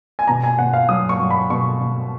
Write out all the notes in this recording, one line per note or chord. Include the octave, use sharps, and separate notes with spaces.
G#5
B2 A#5
G#5
B2 F#5
F5
F#3 D#6
C#6
F#3
B5
B2 C#6
B2